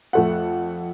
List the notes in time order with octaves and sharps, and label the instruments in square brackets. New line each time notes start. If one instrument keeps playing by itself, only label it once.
[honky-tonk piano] F2 A3 F#5